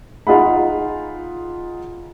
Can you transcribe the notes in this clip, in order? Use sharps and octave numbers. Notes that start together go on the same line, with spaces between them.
D#4 F4 G#4 F#5 B5